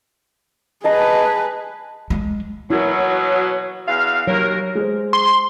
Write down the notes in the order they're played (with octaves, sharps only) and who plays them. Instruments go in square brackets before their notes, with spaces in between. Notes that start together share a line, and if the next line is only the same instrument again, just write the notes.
[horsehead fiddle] G#4 B4 [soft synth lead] D#5 [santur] A5 A#5
[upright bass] G#3
[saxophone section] B2 F#3 [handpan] E4 F#4 A#4
[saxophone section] E2 F5
[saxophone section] D#2 A#4 [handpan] F#3 C#5
[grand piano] G#3 C5
[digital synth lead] C6